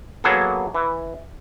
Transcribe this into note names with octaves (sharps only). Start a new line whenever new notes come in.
F#3 A#3 B3 G#4 A4
E3